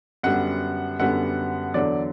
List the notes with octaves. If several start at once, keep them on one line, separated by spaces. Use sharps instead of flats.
F#2 D3 G3 B3 F#5
F#2 D3 G3 B3 F#5
E2 D3 F#3 D5